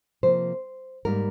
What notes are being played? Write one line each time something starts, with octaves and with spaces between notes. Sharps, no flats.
C3 F3 A#3 C5
G#2 G3 A#3 A#4